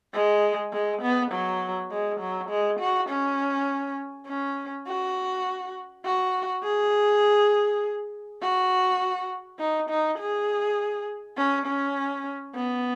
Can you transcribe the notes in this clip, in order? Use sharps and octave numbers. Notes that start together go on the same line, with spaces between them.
G#3
G#3
B3
F#3
G#3
F#3
G#3
F#4
C#4
C#4
F#4
F#4
G#4
F#4
D#4
D#4
G#4
C#4
C#4
B3